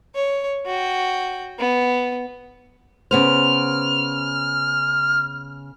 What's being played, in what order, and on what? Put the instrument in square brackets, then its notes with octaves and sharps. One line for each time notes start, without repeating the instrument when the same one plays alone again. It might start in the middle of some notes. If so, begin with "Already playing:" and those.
[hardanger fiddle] C#5
F#4 G5
B3
[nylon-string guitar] C#3 B3 C5 [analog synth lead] F6